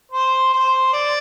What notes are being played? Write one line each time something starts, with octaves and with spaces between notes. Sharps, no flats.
C5
C5
D5